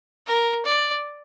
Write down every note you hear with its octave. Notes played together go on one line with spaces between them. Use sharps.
A#4
D5